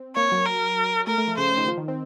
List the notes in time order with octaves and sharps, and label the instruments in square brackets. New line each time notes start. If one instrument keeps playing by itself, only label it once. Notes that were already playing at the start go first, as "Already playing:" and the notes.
Already playing: [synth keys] C4
[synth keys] A#3 [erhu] C#5
[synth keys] F#3
[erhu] A#4
[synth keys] A3 [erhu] A#4
[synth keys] A3
F3
[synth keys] C#3 [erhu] C5
[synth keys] C#3
D#3
F3
D#3
C4